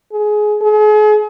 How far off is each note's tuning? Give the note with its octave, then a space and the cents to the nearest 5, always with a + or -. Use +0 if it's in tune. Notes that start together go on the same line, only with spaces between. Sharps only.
G#4 +20
G#4 +40